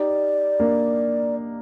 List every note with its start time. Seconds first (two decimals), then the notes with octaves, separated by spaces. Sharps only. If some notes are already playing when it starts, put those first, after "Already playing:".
Already playing: D#4 G4 D5
0.60 A#3 D4